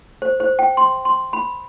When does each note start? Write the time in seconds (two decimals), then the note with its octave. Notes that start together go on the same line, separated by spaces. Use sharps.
0.22 C5
0.40 C5
0.59 G5
0.77 C6
1.05 C6
1.33 B5